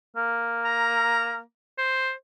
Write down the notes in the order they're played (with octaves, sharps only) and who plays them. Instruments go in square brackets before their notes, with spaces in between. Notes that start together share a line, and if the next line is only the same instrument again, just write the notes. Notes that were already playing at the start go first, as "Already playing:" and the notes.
[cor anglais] A#3
[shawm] A#5
C5